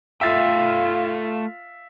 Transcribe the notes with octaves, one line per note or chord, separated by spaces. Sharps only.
A3 F4 A4 E5 F5 G5 A6